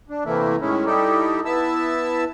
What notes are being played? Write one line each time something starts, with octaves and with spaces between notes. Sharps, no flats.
D4
C3 E3 A3 A#3 E4
A2 D#3 G#3 C#4 E4
G3 D#4 E4 G4 A4
B3 E4 E5 A5 E6